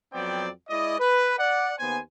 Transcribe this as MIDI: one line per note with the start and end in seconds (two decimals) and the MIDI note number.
0.13 0.49 41
0.13 0.49 54
0.13 0.49 59
0.13 0.49 60
0.13 0.49 74
0.13 0.49 79
0.69 0.97 56
0.69 0.97 64
0.69 0.97 74
0.69 0.97 75
1.00 1.37 71
1.39 1.72 74
1.39 1.72 78
1.79 1.99 39
1.79 1.99 59
1.79 1.99 72
1.79 1.99 80